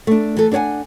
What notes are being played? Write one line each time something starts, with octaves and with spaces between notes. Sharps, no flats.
A3 D4
E3 A4
D4 A4 C#5 F#5 G#5